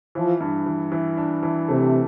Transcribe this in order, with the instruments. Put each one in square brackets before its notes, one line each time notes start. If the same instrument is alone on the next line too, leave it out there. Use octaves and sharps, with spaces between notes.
[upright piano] E3 [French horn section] F3
[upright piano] G2
E3
E3
D4
E3
[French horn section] C3 [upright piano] A3